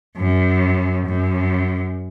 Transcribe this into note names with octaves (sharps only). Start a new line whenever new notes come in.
F#2
F#2